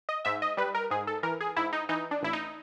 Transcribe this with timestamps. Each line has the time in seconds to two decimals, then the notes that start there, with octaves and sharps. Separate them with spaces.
0.09 D#5
0.25 G#2 E5
0.42 D#5
0.57 G3 B4
0.75 A#4
0.91 G#2 G#4
1.07 A4
1.23 E3 A#4
1.40 G#4
1.56 G#2 E4
1.73 D#4
1.89 E3 D#4
2.11 D4
2.22 A1 E4
2.33 D#4